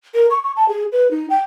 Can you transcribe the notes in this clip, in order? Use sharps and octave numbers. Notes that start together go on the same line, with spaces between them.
A#4
C#6
C#6
A5
G#4
B4
D#4
G5